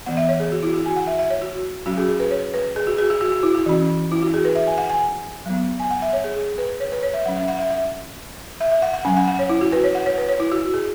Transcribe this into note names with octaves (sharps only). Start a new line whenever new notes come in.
E3 B3 F#5
E5
C#5
G#4
F#4
E4
F#4
G#5
F#5
E5
E5
C#5
F#4
F#3 C#4 F#4
G#4
G#4
B4
C#5
B4
G#4
F#4
G#4
F#4
F#4
F#4
E4
F#4
E3 C#4
E4
F#4
G#4
B4
E5
G#5
F#5
G#5
F#3 B3
G#5
F#5
E5
C#5
G#4
G#4
B4
C#5
B4
C#5
E5
F#3 C#4 F#5
E5
F#5
E5
E5
E5
E5
F#5
F#5
F#3 C#4 G#5
F#5
F#5
C#5
E4
F#4
B4
C#5
F#5
C#5
B4
C#5
E4
F#4
G#4